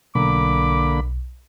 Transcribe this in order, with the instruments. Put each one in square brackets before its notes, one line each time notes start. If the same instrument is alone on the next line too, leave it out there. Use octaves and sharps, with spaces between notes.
[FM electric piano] B1 [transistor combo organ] D3 A#3 B5 [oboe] D6